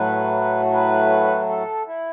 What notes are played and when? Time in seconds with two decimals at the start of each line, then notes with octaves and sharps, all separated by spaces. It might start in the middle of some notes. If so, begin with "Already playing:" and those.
Already playing: A2 F#3 A3 B4
0.73 B4
1.49 A4
1.86 E4